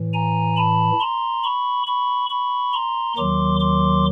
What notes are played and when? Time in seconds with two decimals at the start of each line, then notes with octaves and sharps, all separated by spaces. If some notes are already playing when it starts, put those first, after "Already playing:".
Already playing: A2 E3
0.13 G#5 A#5
0.57 A5 B5
1.00 A#5 C6
1.44 B5 C#6
1.87 B5 C#6
2.29 B5 C#6
2.73 A#5 C6
3.16 D#2 D#3 F#3 C6 D6
3.60 C6 D6